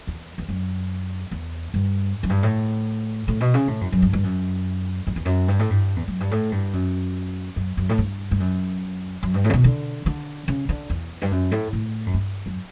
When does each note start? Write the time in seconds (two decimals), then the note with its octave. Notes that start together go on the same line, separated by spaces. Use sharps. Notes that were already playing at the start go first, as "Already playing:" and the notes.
0.07 E2
0.38 E2
0.49 F#2
1.31 E2
1.74 G2
2.23 F#2
2.29 G2
2.43 A2
3.28 A2
3.40 B2
3.54 C#3
3.68 A2
3.81 F#2
3.92 F#2
4.02 G2
4.13 G2
4.24 F#2
5.07 F#2
5.16 E2
5.25 F#2
5.48 G2
5.59 A2
5.71 G2
5.96 E2
6.08 F#2
6.20 G2
6.31 A2
6.52 G2
6.73 F#2
7.56 F#2
7.77 F#2
7.89 A2
7.98 G2
8.31 G2
8.40 F#2
9.23 F#2
9.34 G2
9.44 A2
9.50 C#3
9.53 B2
9.64 D3
10.06 D3
10.48 C#3
10.69 D3
10.90 E2
11.22 G2
11.31 F#2
11.52 A2
11.73 A2
12.06 F#2
12.14 G2
12.46 F#2